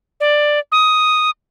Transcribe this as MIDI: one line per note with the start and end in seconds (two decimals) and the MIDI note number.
0.20 0.59 74
0.72 1.30 87